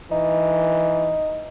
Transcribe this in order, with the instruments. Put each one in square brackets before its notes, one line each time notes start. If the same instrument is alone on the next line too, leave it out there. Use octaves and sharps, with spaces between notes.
[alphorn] E3 [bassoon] D#4